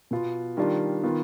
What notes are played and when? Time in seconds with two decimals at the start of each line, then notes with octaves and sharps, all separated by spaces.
0.11 B2 B3 F4
0.57 D#3 G3 D4 F4
1.03 D#3 B3 F4